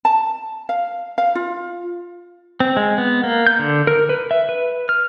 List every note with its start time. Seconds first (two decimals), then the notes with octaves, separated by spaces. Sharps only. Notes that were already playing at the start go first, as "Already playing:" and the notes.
0.05 A5
0.69 F5
1.18 F5
1.35 F4
2.60 C4
2.77 G#3
2.98 B3
3.24 A#3
3.47 G6
3.59 D3
3.87 A#4
4.09 B4
4.31 E5
4.49 B4
4.89 F6